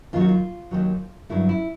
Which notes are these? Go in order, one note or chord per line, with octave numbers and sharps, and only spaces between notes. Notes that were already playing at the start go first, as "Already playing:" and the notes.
D#2 D#3 F#3 F4
F#4
F4
D#2 D#3 F#3
G2 D3 F#3 A3 E4
E4